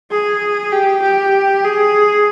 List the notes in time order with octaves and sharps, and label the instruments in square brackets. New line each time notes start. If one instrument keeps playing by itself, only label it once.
[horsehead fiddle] G#4
G4
G4
G#4